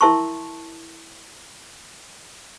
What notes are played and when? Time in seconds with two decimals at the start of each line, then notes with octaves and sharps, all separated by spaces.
0.01 E4 A#4 E5 A5 C6 C#6